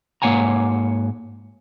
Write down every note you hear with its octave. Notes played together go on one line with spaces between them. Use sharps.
G#2 A#3 C#5 F#5 G#5 A#5